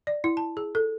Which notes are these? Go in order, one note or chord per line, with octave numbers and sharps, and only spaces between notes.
D5
E4
A5
G#4
A4